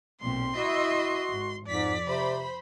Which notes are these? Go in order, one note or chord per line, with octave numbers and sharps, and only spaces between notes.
B1 A#2 C4 C6
E4 F#4 D#5 E5
G#1
F2 G#2 D5 B6
C3 C5 B5